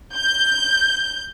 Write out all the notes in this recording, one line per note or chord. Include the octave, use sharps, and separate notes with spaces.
G6